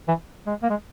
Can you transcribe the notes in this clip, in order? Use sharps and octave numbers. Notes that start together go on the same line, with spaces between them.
E3
G#3
A#3
G#3